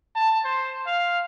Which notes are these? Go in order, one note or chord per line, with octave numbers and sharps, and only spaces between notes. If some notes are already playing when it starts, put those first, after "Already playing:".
A5
C5
F5